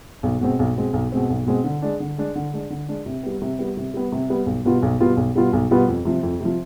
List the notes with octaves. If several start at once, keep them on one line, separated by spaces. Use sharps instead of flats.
B1
B2 G#3 C4
B1
B2 G#3 C4
B1
B2 G#3 C4
B1
B2 G#3 C4
D3
G#3 D4
D3
G#3 D4
D3
G#3 D4
D3
G#3 D4
C3
G3 B3
C3
G3 B3
C3
G3 B3
C3
G3 B3
B1
B2 G3 B3 F4
B1
B2 G3 B3 F4
B1
B2 G3 B3 F4
B1
B2 G3 B3 F4
F2
C3 F3
F2
C3 F3